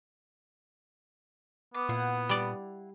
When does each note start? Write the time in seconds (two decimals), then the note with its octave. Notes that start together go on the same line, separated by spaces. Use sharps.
1.74 B3 D6
1.89 A#2 E4 F5 F#5
2.29 G3 D5